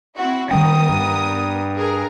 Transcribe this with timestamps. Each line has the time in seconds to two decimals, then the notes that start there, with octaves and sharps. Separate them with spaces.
0.16 C4 E4 F#4
0.51 D#3 G3 B3 C#4 A#4 G5 D#6
0.89 G2
1.77 G#4 A#4 A#5